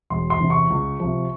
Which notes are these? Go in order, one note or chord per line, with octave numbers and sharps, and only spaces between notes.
E1 C6
C6
E2 C3
C#6
C#2
C3 F3